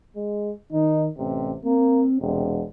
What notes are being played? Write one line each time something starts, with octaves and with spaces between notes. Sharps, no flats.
G#3
D#3 D#4
A1 C3
A#3 C4
E1 C3